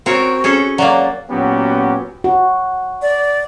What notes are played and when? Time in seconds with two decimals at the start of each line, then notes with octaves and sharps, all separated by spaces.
0.06 C4 F#4 A#4 C#5
0.44 C#4 G#4 A4
0.78 F#3 A#3 D5
1.30 A#2 F#3 B3 C#4 F#4 G4
2.24 F#4
3.02 D5